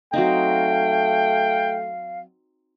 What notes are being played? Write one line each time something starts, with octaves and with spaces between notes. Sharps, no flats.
F#3 A3 C4 D#4 F5 G5